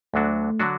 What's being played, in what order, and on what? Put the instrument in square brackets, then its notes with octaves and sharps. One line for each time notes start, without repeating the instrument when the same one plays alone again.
[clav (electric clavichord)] D2 D3 F#3 D4 F#4 [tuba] A3
[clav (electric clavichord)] D3 F#3 D4 F#4